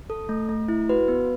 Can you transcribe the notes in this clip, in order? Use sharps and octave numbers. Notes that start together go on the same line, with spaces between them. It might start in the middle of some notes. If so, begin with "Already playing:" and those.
A4
A3
A3
E4
F#4 B4
B3